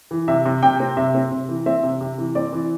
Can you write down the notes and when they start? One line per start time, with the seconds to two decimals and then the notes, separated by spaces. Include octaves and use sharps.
0.11 E3
0.28 C3 E5
0.45 C3
0.63 C3 G5
0.80 C4
0.97 C3 E5
1.14 C4
1.31 C3
1.49 E3
1.66 C4 E5
1.83 C3
2.01 C3
2.18 E3
2.35 C4 D5
2.52 E3